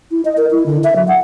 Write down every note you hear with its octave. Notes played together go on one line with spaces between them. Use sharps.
E4
D#5
A#4
E4
D3
E5
F#3
F#5